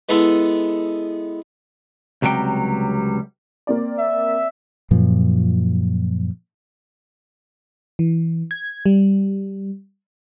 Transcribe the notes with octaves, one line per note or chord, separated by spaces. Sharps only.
G#3 B3 E4 G#4 A4
C#2 C3 F#3 G3 G5
A#3 C4 D5
E5
F#2 A#2 F3
E3
G#6
G3